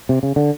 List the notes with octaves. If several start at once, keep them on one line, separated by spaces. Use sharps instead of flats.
C3
C#3
D3